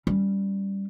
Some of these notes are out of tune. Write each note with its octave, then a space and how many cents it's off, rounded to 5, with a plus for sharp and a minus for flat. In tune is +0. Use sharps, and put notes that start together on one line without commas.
G3 +0 C#4 +0